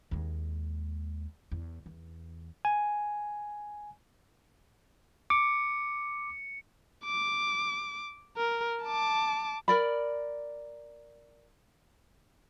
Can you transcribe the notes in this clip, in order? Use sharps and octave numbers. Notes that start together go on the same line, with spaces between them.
D#2 G#3
E2
E2
G#5
D6 C#7
D6
A#4
A5 D6
A#4 D5 B5